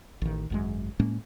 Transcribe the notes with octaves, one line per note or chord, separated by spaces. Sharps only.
A1 D#3
G#1 F#2 G#3
A2 G#3 A#3 C#4